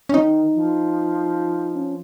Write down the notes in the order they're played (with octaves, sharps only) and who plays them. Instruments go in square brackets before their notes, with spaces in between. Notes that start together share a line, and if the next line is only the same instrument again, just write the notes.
[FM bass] C#4
[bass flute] D#3 [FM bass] D#4
[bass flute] F3
[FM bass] C#4